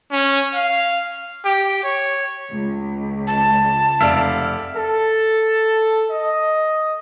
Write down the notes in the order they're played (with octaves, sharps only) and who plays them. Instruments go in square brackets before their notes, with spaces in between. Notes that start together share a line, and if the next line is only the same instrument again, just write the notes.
[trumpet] C#4
F5
G4
C#5
[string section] C#2
[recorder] A5
[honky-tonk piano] F1 D5 D7 [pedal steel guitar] E5 F5
[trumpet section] A4
D#5